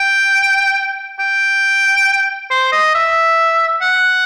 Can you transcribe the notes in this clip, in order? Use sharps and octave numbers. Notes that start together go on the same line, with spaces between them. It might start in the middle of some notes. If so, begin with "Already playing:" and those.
Already playing: G5
G5
C5
D#5
E5
F#5